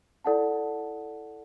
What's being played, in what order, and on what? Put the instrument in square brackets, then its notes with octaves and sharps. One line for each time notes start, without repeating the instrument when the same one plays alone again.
[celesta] E4 A4 D5 F#5 A5